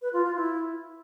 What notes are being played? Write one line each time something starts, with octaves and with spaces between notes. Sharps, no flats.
B4
F4
F4
E4